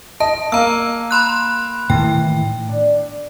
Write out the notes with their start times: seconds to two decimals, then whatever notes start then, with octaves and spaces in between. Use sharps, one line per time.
0.20 D#5 A5
0.52 A#3 A#5 E6
1.11 B5 C6 F#6
1.90 A2 D#3 E3 G5
2.69 D4